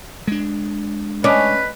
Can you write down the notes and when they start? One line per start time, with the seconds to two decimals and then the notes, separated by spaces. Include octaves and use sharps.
0.27 G#3 D4
1.24 C#4 B4 D5 D#5